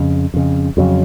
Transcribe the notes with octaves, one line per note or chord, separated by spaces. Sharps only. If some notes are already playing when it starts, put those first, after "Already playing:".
Already playing: F2 C#3
F2 C#3
F2 C#3 F#3